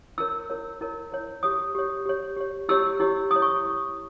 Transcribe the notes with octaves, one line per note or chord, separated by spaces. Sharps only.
E4 A#4 C#5 E6
E4 A#4 C#5
E4 A#4 C#5
E4 A#4 C#5
G4 C#5 D#6
G4 C#5
G4 C#5
G4 C#5
E4 G4 C#5 E6
E4 G4 C#5
E4 G4 C#5 D#6
C#6